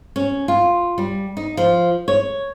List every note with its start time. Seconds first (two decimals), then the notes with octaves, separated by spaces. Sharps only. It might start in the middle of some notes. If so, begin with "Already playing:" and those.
0.16 C#4
0.48 F4
0.98 G3
1.37 D#4
1.57 F3
2.08 C#5